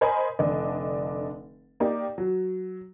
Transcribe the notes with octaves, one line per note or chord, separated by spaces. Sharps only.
A#4 C5 D#5 G#5 B5
F1 D3 D4 D#5
A#3 D#4 G4 D5
F#3